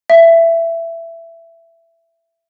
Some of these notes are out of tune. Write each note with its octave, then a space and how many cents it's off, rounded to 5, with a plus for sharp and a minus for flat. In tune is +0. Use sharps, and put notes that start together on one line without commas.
E5 +15